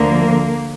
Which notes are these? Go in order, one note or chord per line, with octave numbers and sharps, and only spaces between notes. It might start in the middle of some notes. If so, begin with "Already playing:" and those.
Already playing: D2 D3 F3 A#3